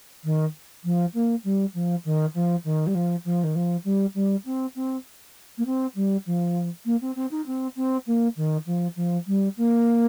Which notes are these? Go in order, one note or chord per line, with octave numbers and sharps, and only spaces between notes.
D#3
F3
A#3
G3
F3
D#3
F3
D#3
G3
F3
F3
D#3
F3
G3
G3
C4
C4
A#3
C4
G3
F3
A#3
C4
C4
D#4
C4
C4
A#3
D#3
F3
F3
G3
A#3